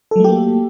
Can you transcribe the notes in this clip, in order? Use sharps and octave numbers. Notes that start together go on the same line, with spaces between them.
F#3 A3 A#3 G4 A4